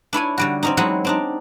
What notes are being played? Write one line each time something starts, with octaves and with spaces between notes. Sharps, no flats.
D4 E4 C#5 G#5
D3 G3 F#4
C4 C#4 D#4
F#3 G#3 C4 E4 F#5
C4 D4 D#4